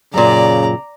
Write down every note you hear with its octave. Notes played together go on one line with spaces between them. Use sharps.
F#2 A#2 C#3 D5 A#5